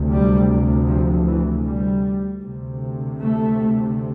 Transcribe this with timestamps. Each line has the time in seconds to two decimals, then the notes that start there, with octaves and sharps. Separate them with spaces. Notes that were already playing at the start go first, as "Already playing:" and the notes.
Already playing: D2 C3
0.11 G3
0.88 F3
1.27 E3
1.65 G3
2.42 D2 C3
3.20 A3